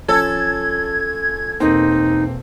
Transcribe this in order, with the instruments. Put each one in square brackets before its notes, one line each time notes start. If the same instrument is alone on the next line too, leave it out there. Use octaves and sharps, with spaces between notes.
[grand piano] F3 C#4 [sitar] A4 [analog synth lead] G#6
[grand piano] E1 A#3 C4 [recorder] D#4